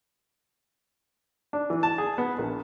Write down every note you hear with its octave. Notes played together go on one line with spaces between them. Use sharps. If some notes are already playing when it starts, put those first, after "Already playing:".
D4
E3
A5
G#4
B3
A#1